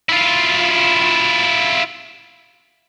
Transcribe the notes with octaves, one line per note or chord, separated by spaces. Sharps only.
E4 F4